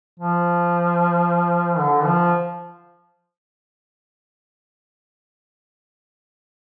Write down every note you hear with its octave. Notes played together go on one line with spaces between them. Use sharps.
F3
D3
F3